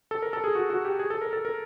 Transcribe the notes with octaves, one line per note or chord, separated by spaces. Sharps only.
A4
A#4
A4
G#4
F#4
F#4
G4
G#4
A4
A#4
A4
A#4